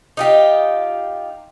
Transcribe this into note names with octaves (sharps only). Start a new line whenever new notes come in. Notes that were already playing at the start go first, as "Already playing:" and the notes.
D#4 F4 G4